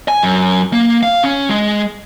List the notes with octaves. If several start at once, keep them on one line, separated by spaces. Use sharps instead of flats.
G#5
F#2
A#3
F5
C#4
G#3